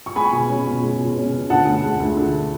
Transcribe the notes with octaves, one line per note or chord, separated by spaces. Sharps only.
C#6
G#3 G#5 B5
B2
C#4
B2
G#3
B2
C#4
B2
D3 F#5 A5
D2
G#3
D2
D3